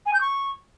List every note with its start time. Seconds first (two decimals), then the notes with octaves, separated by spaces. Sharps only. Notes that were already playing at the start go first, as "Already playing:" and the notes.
0.05 G#5
0.13 G6
0.20 C#6